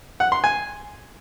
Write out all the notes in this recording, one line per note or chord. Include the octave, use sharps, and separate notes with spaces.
F#5
C6
G#5